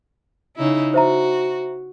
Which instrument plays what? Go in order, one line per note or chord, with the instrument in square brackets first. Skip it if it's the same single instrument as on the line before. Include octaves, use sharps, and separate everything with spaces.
[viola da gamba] C#3 D#4 E4
[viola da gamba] F#4 [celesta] C5 E5 A#5